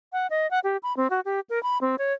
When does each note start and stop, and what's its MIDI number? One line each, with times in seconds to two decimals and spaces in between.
0.13 0.27 78
0.30 0.49 75
0.51 0.60 78
0.64 0.77 67
0.83 0.96 83
0.97 1.08 60
1.10 1.20 66
1.25 1.40 67
1.50 1.62 70
1.63 1.78 83
1.81 1.96 60
1.98 2.13 73